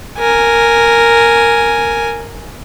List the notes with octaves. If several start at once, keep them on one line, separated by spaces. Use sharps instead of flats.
A#4 G#5